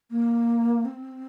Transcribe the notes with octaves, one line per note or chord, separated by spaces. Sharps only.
A#3
C4